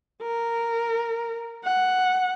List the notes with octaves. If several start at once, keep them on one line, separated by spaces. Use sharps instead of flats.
A#4
F#5